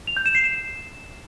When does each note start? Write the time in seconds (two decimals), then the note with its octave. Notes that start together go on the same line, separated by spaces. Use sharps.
0.07 F7
0.17 G6
0.26 E7
0.35 C7
0.44 E7